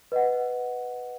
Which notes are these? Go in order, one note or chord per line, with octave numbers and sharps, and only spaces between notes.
B4 D#5 F#5